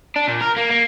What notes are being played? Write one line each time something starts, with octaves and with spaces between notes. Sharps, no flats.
D4
A#2
A#4
A#3
A#3